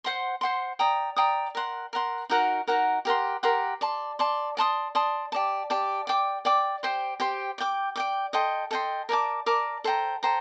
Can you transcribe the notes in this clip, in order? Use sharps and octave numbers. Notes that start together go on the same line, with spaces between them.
C5 F#5 C6
C5 F#5 C6
D5 G5 A#5 D#6
D5 G5 A#5 D#6
A#4 F#5 C6
A#4 F#5 C6
D#4 F#4 A#4 F#5
D#4 F#4 A#4 F#5
G4 A#4 F#5 C6
G4 A#4 F#5 C6
D5 A5 C6
D5 A5 C6
D5 A5 C6 D#6
D5 A5 C6 D#6
G4 D5 A5
G4 D5 A5
D5 G5 D6
D5 G5 D6
G4 C5 G5 C6
G4 C5 G5 C6
D5 G5 D6
D5 G5 D6
A4 D#5 G5 C6
A4 D#5 G5 C6
A#4 D5 A5 D6
A#4 D5 A5 D6
A4 C5 G5 A#5
A4 C5 G5 A#5